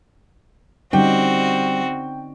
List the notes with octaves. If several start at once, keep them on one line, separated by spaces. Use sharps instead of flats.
D3 G3 C4 C#4 D#4 F#4 G5